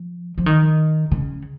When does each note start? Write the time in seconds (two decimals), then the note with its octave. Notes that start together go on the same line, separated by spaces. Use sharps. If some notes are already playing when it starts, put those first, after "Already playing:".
Already playing: F3
0.38 F3
0.46 D#3
1.12 C#3